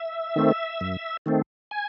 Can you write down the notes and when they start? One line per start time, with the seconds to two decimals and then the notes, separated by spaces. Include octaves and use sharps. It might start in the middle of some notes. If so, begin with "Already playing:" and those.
Already playing: E5
0.36 D#3 A3 C4
0.81 F#2
1.26 D#3 A3 C4
1.71 G#5